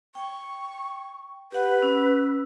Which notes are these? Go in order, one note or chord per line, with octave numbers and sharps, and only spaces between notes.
G5 C#6
G4 B4 F#5
C#4 E6